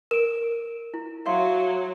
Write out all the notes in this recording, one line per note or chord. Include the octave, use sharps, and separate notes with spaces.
A#4 D7 E7
E4
F#3 E5 F5 C6